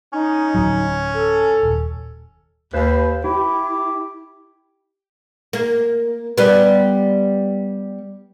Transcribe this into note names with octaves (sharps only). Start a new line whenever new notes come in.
C#4 D#4
D1 F#3
A4
D#1
D#2 B4 C5
E4 G4
A#3
G3 B3